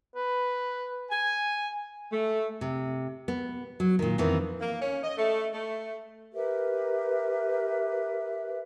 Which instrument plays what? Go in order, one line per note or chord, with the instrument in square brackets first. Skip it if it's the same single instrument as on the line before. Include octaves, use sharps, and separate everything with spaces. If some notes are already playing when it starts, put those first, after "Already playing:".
[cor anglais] B4
[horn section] G#5
A3
[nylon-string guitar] C3
B3
F#3
A#2 D#3
F2 D#3 E3 B3 C4
[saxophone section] A#3
C#4
D#5
A3
A3
[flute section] G4 A#4 B4 E5